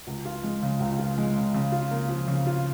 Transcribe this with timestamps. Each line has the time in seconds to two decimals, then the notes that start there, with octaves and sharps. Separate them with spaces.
0.07 C#2
0.25 F4
0.43 G#3
0.63 C#3
0.80 C#2
0.99 F4
1.18 G#3
1.36 C#3
1.54 C#3
1.72 F4
1.91 A#3
2.09 F3
2.28 C#3
2.47 F4